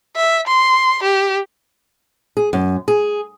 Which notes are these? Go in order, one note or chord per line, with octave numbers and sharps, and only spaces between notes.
E5
C6
G4
G#4
F#2
G#4